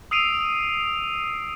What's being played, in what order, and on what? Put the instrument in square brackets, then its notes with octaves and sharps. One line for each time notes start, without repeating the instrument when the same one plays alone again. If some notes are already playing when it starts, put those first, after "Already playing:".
[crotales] D#6 E6 C7 D7 D#7 F7